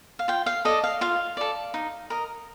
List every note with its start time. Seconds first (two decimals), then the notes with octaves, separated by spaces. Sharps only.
0.19 F5
0.28 F4 G5
0.46 F5
0.65 A4 D5 D#5
0.84 F5
1.01 F4 F5
1.37 A4 D5
1.74 D#4
2.10 A#4 D#5